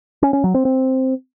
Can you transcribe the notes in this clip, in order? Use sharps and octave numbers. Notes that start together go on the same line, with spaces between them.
C#4
C#4
F#3
C4
C4